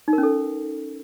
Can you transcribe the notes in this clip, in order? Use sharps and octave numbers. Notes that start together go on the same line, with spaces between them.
D#4
A#4
C#4
A4